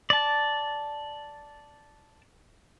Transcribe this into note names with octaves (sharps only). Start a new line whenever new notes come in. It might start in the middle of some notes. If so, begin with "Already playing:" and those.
D5 A5